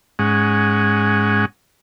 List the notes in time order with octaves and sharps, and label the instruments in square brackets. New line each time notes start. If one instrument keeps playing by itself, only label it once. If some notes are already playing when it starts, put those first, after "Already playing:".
[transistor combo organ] G#2 G#3 C#4 F#5